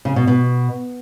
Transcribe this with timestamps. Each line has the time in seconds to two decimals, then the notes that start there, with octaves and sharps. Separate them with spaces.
0.05 C#3
0.16 B2
0.27 B2